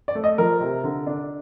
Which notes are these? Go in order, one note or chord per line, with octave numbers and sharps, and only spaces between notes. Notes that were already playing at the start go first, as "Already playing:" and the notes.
D5
A3
D#5
F3 A#4
C3
D3
D4